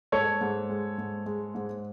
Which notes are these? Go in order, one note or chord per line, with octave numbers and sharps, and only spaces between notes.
G#2 A4 C#5
G#2
G#3
G#2
G#3
G#2